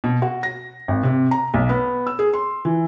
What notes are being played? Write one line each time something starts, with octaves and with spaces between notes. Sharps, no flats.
B2
F#4
A#6
G#1
C3
A#5
B1
B3
E6
G#4
C6
E3